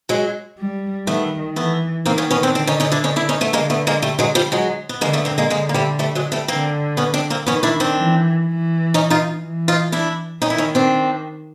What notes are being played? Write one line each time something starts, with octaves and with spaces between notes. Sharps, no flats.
F#3 G#3
G3
D#3 A3 B3
E3 A3 B3
D#3 A#3 C4
B3 C#4
B3 C#4
C4 D4
D3 C4 D4
C#4 D#4
C#4 D#4
D4 E4
C#4 D#4
D4 E4
C#4 D#4
A3 B3
D3 G#3 A#3
A3 B3
G#3 A#3
G3 A3
F#3 G#3
F3 G3
F#3 G#3
B3
D3 G#3 A#3
A3 B3
A#3 C4
G#3 A#3
D3 G#3 A#3
A#3
G3 A3
G3 A3
F#3 G#3
G3 A3
D3 A#3 C4
B3 C#4
C4 D4
A#3 C4
D#3 B3 C#4
D4 E4
C4 D4
E3
E3
C#4 D#4
D#4 F4
E3
D#4 F4
D4 E4
D#3 C#4 D#4
E4
C#4 D#4
C4 D4